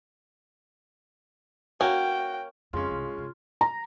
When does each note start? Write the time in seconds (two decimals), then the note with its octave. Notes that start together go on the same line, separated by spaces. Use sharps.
1.81 A#3 C#4 F#4 G5
2.73 F2 C#3 G#3 C#4 F4
2.88 C2 G2
3.17 G1 C3
3.61 A#5